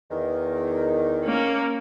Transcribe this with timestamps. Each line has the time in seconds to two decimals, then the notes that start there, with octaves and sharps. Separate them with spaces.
0.10 E2 D#3
1.24 A#3 C#4